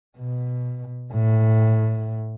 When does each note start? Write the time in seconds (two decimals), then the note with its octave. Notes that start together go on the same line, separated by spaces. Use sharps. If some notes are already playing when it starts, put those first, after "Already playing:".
0.18 B2
1.13 A2